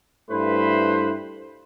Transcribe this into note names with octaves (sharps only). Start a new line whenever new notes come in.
G2 A3 E4 B4 C5 B5